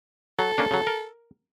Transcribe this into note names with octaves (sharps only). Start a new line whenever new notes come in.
F#3 A4
A#3 C#4 D4
C#3 F#3
A#4